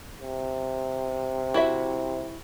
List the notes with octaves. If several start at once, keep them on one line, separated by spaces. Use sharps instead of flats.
C3
E4 F#4 E5